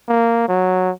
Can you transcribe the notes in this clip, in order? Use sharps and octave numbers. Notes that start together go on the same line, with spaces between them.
A#3
F#3